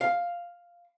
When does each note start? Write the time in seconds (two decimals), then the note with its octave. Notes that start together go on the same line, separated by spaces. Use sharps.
0.01 F5